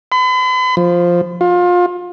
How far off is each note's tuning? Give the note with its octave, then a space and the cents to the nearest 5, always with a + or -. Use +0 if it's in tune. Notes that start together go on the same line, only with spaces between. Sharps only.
B5 +45
F3 +0
F4 +25